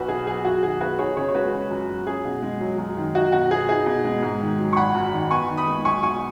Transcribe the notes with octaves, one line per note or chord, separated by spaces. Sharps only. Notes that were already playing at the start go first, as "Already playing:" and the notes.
Already playing: B1 F#4 B4
B2 G#4
F#3 G#4
F#2 F#4
D#3 G#4
B3 F#4 B4
D#4 G#4 C#5
C#3 G#4 C#5
C#5
G#3 F#4 B4
C#4
F#2
F#3
C#4 G#4
B2
G#3
F#3
F#2
D#3
D#4 F#4
B2 F#4
B3 G#4
D#4 G#4
B2
G#3
G#2
D#3
F#3
C#6
G#1 F#5 B5
F#2
D#3
B3 G#5 C#6
D#3
B5 D#6
G#3
B1 G#5 C#6
B2 G#5 C#6